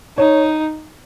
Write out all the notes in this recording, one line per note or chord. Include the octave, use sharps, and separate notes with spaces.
D#4 C#5